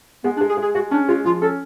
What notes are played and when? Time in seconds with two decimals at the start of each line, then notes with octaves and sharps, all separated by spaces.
0.24 G#3 B3
0.37 D4
0.41 G#3
0.50 G#4
0.57 G#3
0.63 G#4
0.75 G#3 F#4
0.91 C#4 D4
1.08 G#3 F4
1.25 F3 F4
1.42 C#4 A4